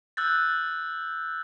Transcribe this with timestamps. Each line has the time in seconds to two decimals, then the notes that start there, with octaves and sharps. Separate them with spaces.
0.17 E6 F#6 G6 A6